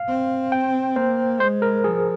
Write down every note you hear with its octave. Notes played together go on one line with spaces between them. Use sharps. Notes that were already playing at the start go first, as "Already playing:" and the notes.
Already playing: F5
C4
G5
A#3 C5
G#3 C5
A#4
F3 G#4